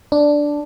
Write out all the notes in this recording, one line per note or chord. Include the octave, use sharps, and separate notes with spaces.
D4